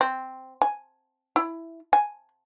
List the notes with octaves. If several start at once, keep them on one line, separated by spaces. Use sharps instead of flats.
C4
G#5
E4
G#5